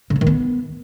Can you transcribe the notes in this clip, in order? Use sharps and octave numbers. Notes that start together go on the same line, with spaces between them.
C#3
A#3
D#3
B3